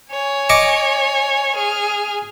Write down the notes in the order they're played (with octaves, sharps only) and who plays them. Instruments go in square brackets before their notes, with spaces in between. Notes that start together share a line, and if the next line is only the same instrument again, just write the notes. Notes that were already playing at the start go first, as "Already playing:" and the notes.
[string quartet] C#5 G#5
[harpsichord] D#5 C#6 D6
[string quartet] G#4 F6